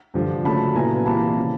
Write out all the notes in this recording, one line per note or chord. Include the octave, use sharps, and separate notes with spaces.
G2 D3 F3
C#3 F#3 A3 A5 B5
A#2 F#3 B3 E4 G#5 A#5
C3 E3 G3 A#3 A5 B5
C#3 F3